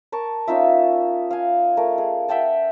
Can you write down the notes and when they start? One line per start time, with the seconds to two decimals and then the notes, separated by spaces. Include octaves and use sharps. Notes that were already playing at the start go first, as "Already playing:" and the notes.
0.12 A#4 A5 C#6
0.48 C#4 D#4 F4 E5
1.31 F5 G#5
1.77 A3 A#4
1.98 G#4
2.29 E5 F#5 G5 A5